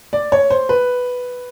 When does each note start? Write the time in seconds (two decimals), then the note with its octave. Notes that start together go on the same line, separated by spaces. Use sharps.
0.13 D5
0.32 C#5
0.50 C5
0.69 B4